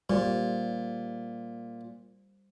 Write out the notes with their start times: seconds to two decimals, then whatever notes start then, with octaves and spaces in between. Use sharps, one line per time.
0.10 A#2 G3 C5